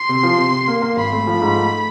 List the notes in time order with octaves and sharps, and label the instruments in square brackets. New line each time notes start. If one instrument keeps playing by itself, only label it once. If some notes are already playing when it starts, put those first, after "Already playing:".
Already playing: [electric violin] C6
[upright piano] C3
F3
C3
C3
A#3
A#3
[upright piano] G#1 [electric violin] B5
[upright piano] A3
F3
G#2
A3